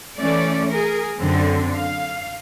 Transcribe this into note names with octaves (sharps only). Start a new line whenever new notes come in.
E3 A3 C#4 D5
G#4 A#4
F#2 D3 C4
F5